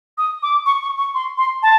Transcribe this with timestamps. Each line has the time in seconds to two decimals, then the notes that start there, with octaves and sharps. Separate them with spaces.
0.18 D#6
0.43 D6
0.66 C#6
0.82 C#6
0.98 C#6
1.15 C6
1.38 C6
1.63 A5